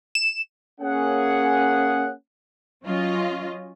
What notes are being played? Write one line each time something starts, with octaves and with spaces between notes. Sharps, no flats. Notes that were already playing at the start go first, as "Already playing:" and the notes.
E7
A#3 C#4 G#4 F#5
F#3 C#4 F4 D#5